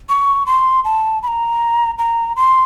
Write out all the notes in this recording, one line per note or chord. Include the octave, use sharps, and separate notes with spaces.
C#6
C6
A5
B5
A#5
A#5
C6